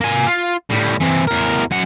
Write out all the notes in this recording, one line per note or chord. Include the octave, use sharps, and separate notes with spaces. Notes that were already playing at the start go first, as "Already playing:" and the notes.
A#3 G#5
F4
A2 G3
E3 C4
E2 A#4
F#2 F#5